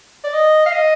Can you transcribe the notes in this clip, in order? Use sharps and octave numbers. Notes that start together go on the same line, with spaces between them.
D5
D#5
F5
D#5